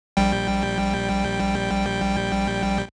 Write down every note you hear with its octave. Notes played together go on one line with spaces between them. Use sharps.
A#1 G3 G5